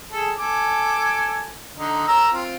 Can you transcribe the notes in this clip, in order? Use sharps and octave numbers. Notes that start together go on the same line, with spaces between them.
G#4 A4
A4 G#5 D6
D3 D#4
A#4 A#5 E6
C4 F4